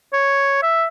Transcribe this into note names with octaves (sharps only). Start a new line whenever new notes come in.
C#5
E5